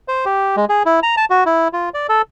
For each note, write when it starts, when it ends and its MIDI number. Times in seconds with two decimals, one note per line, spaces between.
0.08 0.25 72
0.25 0.56 67
0.57 0.65 56
0.69 0.83 68
0.85 1.00 64
1.03 1.15 82
1.17 1.25 81
1.30 1.44 66
1.46 1.68 64
1.73 1.89 65
1.94 2.07 74
2.09 2.22 69